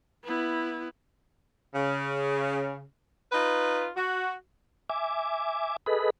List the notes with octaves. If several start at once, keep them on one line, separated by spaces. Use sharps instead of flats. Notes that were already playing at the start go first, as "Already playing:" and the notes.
B3 E4
C#3
D#4 F4 B4
F#4
E5 G#5 D6
G#4 A4 B4 D#5 B5